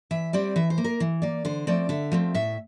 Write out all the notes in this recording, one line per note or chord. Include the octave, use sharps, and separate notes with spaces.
E3 E5
G3 C4 D5
E3 E5
C5
A#3
A#4
E3
A#3 D5
D3 C5
F3 A3 C4 D5
D3 E5
F3 A3 C4
A2 E5